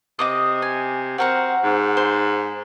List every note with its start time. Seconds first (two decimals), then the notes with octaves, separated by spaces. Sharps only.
0.19 C3 D#5 D6 D#6
0.62 G#5
1.18 C4 F#4 A#4 F#5
1.64 G#2
1.97 C5